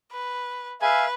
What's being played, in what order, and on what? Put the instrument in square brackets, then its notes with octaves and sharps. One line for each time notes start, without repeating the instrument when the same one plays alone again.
[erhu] B4
[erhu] B4 [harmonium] E5 F5 [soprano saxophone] G#5